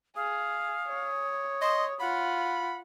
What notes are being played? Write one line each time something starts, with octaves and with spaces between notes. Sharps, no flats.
G#4 F5 D#6
C#5
D#5 C6
F4 F#5 B5